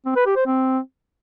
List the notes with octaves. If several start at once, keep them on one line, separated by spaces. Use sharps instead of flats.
C4
B4
G4
C5
C4